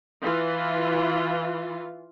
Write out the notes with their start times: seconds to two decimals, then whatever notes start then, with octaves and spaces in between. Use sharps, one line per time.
0.22 E3 F4